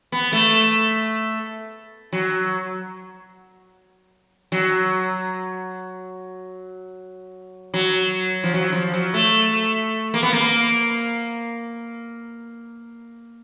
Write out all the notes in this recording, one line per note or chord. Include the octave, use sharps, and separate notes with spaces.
B3
A3
F#3
F#3
F#3
F3
F#3
F3
F#3
A3
A#3
B3
A#3